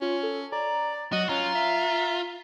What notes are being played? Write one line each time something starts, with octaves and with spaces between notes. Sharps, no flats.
C#4 F4
A4
D5 A#5
F#3 F#4 D#5
C#4 F4 A#5
E5